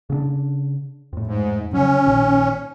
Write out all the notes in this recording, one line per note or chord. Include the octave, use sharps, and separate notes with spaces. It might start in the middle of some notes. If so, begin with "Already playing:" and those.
C#3 C4 D4
F2 A2
G#2
C#3 F#3 C#4
A#1 A#2 D#3